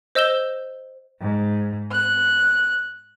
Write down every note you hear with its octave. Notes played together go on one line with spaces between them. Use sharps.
C5 D#5 E6 G6 E7 G7
G#2
F#6